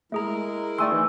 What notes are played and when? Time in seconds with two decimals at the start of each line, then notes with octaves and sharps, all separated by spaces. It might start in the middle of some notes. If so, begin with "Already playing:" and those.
0.12 G#3 A3 E4 G#4 A#4 A#5
0.78 D#3 A3 D5 G#5 C6 E6
0.92 E3 D#4